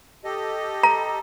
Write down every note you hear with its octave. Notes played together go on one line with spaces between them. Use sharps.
G4 A4 D#5
A#5